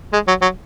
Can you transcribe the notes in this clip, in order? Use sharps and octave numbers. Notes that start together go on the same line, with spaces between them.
G#3
F#3
F#3